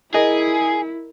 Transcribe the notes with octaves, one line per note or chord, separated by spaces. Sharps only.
E4 G#4 A#4 D#5